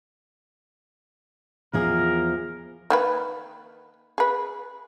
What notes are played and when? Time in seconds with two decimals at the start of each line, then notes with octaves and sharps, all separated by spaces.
1.73 E2 F3 G#4 A#4
2.90 D#3 A#3 B4
4.18 G#4 B4